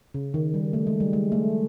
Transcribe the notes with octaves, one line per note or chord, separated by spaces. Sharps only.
C#3
D#3
G3
A3
G#3
G3
G#3
A3